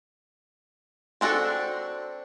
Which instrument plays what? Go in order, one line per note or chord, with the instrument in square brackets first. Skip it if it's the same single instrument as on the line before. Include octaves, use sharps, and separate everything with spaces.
[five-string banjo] C4 D4 F#4 G#4 A4